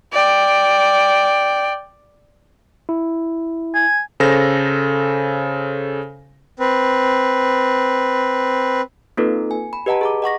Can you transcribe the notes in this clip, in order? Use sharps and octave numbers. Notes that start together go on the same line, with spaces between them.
D5 G5
E4
G#5
C#3 A4 C5 A#6
C4 B4
A#3 C4 D#4 F4 A4 B4
G#5
B5
G4 B4 D#5 F#5 A5 A#5
G#4 A#5 D6
D#5 F#5 C#6 A#6